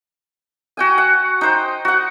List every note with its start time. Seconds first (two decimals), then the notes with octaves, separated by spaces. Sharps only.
0.77 F#4 G5 G#5
0.98 F#5
1.41 D#4 C5 G5
1.85 F#4 F#5